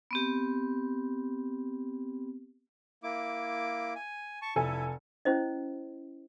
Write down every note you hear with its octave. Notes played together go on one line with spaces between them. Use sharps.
B3 C4 G4
A#3 E4 D6
G#5
A5 C#6
F1 E4 A4 G#5
C#4 E4 C5 D#5